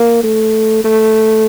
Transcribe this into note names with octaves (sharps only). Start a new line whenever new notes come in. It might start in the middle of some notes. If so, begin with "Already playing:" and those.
Already playing: A#3
A3
A3